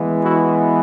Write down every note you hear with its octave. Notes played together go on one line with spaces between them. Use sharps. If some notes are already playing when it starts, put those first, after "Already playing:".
Already playing: E3 G#3 B3
E4 F#4